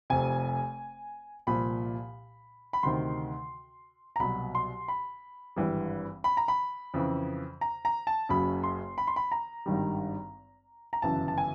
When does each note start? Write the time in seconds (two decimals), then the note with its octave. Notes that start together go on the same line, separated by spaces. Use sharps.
0.10 F1 F2 C3 G#5
1.47 C2 A#2 F3 B5
2.73 B5
2.83 D2 C3 D#3 C6
4.16 A#5
4.19 C2 B2 F#3 B5
4.55 C6
4.88 B5
5.56 G#1 G2 E3 G3
6.24 B5
6.37 A#5
6.48 B5
6.94 F2 C#3 E3
7.61 A#5
7.85 A#5
8.07 A5
8.29 F#1 F#2 C#3 F#3 B5
8.63 C6
8.98 B5
9.08 C6
9.16 B5
9.32 A#5
9.66 G#1 G2 D#3 G3
10.93 A#5
11.02 G1 F#2 C#3 E3 A5
11.28 A5
11.38 G#5